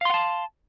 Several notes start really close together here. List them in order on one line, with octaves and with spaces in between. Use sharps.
F5 C6 F#5 A5